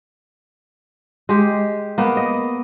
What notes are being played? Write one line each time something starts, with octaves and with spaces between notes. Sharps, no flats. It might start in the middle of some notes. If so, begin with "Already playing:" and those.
G#3 G4
A#3 B3
D#5